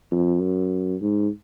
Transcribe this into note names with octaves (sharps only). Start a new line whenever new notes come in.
F2
F#2
G#2